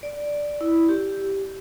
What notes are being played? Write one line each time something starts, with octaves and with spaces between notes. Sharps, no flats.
D5
E4
G4